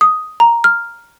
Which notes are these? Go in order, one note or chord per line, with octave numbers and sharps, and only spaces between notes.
D#6
A#5
F6